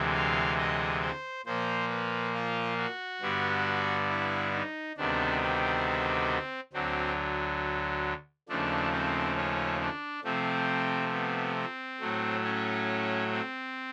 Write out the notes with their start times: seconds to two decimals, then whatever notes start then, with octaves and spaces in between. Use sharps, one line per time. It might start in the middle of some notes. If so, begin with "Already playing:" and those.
Already playing: D2 C3 E3 G#3
0.14 F5
0.58 D#5
1.02 C5
1.46 A#2 F3 A#3 C5
1.90 B4
2.34 F4
2.78 F#4
3.22 G2 D3 G3 B3
4.09 E4
4.53 D#4
4.97 D2 C3 D#3 G3 B3 D4
5.41 C4
6.73 D2 D3 F#3 C4
8.49 D#2 C#3 F3 A3 D4
8.92 C4
9.37 C#4
9.80 D4
10.24 C3 F3 A3 C4
11.12 B3
11.57 C4
12.00 A2 F#3 A3
12.44 C#4
13.32 C4